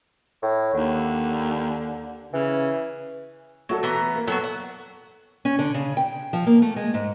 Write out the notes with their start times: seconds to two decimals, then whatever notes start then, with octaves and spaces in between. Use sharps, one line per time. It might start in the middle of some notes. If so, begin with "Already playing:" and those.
0.42 A2
0.74 D#2 D3
2.33 C#3 E3
3.69 F#3 A3 F#4 A4
3.83 E3 B3 A#5
4.15 A#3
4.27 F#3 B3 F#4 A4
4.44 F#5
5.45 C#4
5.59 D3
5.74 C#3
5.97 G5
6.33 F3
6.47 A#3
6.62 A3
6.76 G#3
6.94 G#2